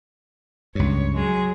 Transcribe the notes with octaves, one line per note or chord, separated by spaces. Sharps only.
C#2 G2 C#5
F#3 G#3 G#4